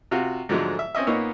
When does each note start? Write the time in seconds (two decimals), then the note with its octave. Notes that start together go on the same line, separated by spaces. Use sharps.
0.11 C3 F4 F#4
0.49 G#2 D3 F3 F#3 G#3 A3
0.79 E5
0.95 C4 C#4 D#5 E5
1.07 A#2 A#3 B3 D#4 C#5 E6